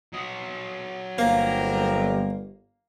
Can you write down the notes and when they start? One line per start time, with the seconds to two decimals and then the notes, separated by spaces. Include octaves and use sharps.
0.12 F#3 D#5
1.18 G1 A#3 C4 G4 A#4